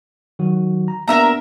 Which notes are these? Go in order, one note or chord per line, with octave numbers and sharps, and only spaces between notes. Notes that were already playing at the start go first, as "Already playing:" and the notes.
D#3 F#3 F#4
A#5
A#3 B3 D4 A#4 E5 A#5